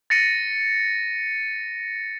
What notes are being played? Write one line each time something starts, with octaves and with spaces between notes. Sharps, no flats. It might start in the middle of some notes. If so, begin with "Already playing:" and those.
A6 A#6 C#7 D#7